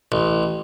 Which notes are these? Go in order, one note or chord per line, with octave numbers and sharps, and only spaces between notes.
A1